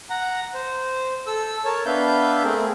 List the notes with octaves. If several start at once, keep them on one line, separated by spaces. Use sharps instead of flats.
F#5 A#5
C5
A4 E6
A#4 C#5 A5
B3 D4 B4 E5 F5 G6
A3 C4 G#4 A#4